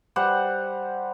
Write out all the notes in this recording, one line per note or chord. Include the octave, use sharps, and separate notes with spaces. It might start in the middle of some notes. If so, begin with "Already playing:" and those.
G3 C5 F#5